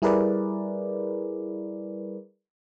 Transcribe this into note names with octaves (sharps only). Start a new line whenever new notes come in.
G3 E4 G#4 A#4 B4 D5